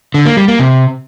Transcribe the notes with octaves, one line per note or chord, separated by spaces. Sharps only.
D3
A#3
G3
A#3
C3